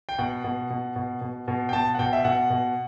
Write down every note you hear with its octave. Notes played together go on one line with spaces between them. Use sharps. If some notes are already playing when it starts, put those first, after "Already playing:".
G5
B2 F#5
B2
B2
B2
B2
B2
G5
B2 A5
F#5
B2 G5
E5
B2 F#5
B2